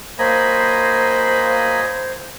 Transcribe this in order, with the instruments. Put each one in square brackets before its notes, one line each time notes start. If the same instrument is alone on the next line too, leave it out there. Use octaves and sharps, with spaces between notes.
[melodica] F#3 D#5 G#5 [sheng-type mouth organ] A#3 B5 [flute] C5